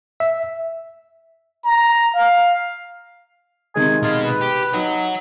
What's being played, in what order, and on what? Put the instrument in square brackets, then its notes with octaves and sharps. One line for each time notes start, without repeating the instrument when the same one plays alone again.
[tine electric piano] E5
[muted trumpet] A#5
F5
[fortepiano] C3 D#3 G#3 [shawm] G#5
[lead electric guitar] B2 D#5 [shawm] F4
[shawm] B4
[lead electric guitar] G4
[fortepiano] D#4 [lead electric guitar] C#5 F#5